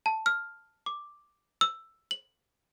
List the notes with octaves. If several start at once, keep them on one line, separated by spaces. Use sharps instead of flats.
A5
F6
D6
E6
F#7